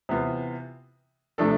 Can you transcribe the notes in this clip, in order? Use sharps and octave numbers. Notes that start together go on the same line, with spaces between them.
C3 E3 B3 F4
C3 F3 A3 D4 A4